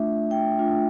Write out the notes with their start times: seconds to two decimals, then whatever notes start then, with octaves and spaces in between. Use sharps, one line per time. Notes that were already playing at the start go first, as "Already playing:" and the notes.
Already playing: A3 D4 F4 E5
0.31 G5
0.59 A3 D4 F4